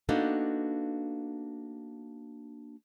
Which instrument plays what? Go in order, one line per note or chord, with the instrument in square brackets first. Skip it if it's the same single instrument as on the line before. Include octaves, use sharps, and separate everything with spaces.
[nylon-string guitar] A#3 B3 D4 D#4 F#4 A4